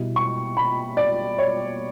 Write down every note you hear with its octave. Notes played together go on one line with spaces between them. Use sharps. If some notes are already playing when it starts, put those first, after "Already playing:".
Already playing: B2 G3 B3 E4
C#6
B5
D5
C#5